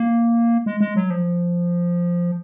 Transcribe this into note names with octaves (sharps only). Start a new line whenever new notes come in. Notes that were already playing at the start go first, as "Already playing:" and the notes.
Already playing: A#3
G#3
G#3
F#3
F3